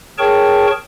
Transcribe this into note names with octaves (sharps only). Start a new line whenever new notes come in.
G#4 A#4 C#5 G5 A5 C#6